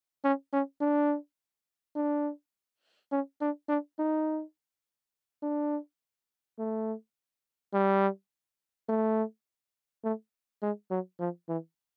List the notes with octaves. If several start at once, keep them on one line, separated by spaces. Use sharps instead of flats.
C#4
C#4
D4
D4
C#4
D4
D4
D#4
D4
A3
G3
A3
A3
G#3
F#3
F3
E3